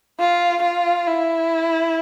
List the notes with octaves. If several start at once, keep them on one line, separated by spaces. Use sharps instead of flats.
F4
F4
E4